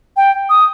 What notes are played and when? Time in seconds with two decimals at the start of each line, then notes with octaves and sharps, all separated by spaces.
0.17 G5
0.50 D#6